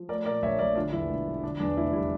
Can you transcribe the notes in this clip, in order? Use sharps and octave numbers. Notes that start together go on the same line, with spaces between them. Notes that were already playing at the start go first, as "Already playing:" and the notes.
Already playing: F3
A3 A#4 D5
A#2 A#4 D5
A#1 C#5 E5
A#1 A#4 D5
D3 D4 F4
E2 E4
E1
F3
D3 D4
E2 D4
F1 E4
G3 E4